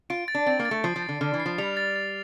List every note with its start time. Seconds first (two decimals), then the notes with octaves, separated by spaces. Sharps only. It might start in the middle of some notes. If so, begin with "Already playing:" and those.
0.10 F4 D7
0.28 A6
0.35 D4
0.46 C4 A6
0.59 A#3
0.65 A6
0.71 A3
0.84 F3 C7
0.96 F3
1.03 A6
1.09 D3
1.21 D3 F6
1.34 E3
1.40 C7
1.46 F3
1.58 G3 F7
1.77 A6
1.96 A6